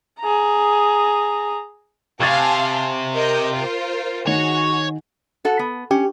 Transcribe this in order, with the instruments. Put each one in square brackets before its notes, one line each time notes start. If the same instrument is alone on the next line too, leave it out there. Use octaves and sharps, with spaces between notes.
[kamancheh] G#4 A#5
[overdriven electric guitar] C3 [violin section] F5 G#5 A5 [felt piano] C#6 G#6 A6
[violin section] A#4 D#5 G6
F4 A#4 C5
[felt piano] D#3 [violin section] F#4 G#4 [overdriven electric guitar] C#5
[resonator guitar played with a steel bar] F#4 A4 F#5
B3
[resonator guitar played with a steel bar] C#4 [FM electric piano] G4